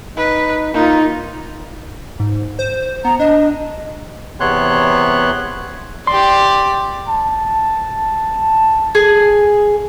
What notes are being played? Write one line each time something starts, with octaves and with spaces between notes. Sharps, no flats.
D#4 B4
A#3 D#4 F4
G#2
C5
B3 A#5
D4 D#5
E2 C3 B3 C#5 C6 F#6
G4 D5 C6
A5
G#4